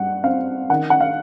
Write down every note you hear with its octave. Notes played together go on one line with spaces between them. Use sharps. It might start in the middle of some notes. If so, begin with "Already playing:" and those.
Already playing: G2 G3 F#5
C4 F5
D#3 F#5
F#5
F5